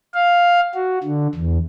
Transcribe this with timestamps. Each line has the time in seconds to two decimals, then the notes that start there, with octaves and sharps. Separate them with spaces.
0.14 F5
0.75 F#4
1.04 D3
1.35 E2